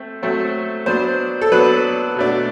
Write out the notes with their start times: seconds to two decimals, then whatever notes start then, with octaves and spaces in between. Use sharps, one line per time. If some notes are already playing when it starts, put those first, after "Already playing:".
Already playing: A3 C4
0.22 F#3 A3 C4
0.86 F#3 B3 D4 C5
1.41 A4
1.52 F#3 B3 D4 B4
2.16 B2 A3 D4